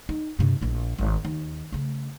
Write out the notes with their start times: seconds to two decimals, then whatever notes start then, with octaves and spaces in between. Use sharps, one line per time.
0.09 D#4
0.39 G2 C3
0.61 A#1 E4
0.98 G#1
1.25 D#2
1.72 C#3 A3